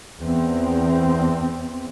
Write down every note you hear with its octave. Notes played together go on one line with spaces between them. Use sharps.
E2 C4